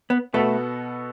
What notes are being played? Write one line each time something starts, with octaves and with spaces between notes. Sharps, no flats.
B3
B2 A3 B3 F#4 A4